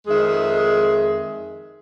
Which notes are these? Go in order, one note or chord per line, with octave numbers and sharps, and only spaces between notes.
F2 D#3 G#3 G#4 E5